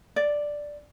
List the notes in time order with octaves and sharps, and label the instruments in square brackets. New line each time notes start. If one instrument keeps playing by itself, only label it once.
[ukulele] D5